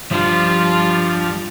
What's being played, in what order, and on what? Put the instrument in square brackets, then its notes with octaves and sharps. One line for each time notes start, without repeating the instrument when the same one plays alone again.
[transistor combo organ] G2 D4 F6 [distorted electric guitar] F3 [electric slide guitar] G3 [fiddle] F4